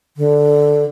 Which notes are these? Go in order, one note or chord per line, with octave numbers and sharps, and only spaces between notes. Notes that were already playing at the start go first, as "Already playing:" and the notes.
D3